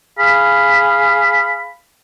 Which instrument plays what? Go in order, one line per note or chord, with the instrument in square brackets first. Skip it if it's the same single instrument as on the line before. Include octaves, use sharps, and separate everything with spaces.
[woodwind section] G#4 F5 B5